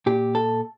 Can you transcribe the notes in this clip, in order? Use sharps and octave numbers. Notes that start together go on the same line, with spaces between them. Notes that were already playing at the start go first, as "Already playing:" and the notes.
A#2 G4
A4